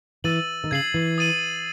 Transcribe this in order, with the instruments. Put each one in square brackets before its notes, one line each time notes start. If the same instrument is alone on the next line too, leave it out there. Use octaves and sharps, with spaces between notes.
[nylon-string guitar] E3 [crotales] E6 A6 D#7 F#7
[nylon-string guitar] D#3
[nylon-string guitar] C#3 [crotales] G#6 C7 F#7
[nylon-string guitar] E3
[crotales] D#6 A6 D#7 F#7